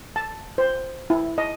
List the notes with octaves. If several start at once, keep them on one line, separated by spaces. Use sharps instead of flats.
A5
C5
E4
D#5